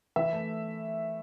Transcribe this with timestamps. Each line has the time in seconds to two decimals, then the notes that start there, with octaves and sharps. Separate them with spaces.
0.16 E3 E5
0.33 A3